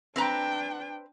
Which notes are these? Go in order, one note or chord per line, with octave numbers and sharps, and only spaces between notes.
C4 D4 B4 G5 A#5